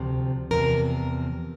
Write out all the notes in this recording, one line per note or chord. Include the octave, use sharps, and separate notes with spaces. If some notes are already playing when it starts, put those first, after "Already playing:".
Already playing: D2 C3 F3
E2 C3 F3 A#4